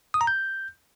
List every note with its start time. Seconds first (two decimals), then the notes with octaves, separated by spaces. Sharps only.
0.14 D#6
0.21 A#5
0.27 G6